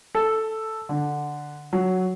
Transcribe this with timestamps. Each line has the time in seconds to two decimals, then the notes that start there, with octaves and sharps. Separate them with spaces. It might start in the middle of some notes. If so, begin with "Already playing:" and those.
0.15 A4
0.89 D3
1.73 F#3